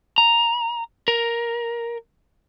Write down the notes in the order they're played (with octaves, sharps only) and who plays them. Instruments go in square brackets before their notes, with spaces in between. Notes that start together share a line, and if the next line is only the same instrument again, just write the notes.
[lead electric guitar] A#5
A#4